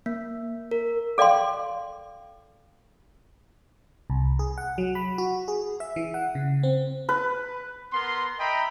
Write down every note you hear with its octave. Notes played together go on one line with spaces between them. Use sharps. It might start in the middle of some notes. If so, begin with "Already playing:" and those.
A#3
A#4
A4 D5 F5 G5 C6
C2
G#4
F#5
F#3
B5
F#4
G#4
E5
E3
F#5
C#3
C4
B4
B3 A#4 C6
D#5 E5 G5 A#5 B5